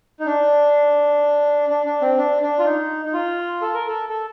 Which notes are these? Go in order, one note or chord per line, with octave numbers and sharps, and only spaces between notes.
D#4
D4
D4
D4
C4
D4
D4
F4
D#4
D#4
F4
A4
A#4
A4
A4